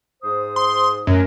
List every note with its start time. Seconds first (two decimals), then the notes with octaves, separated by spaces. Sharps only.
0.23 G#2 C5 D#6
0.56 C6
1.07 F#2 D#3 A3 A#4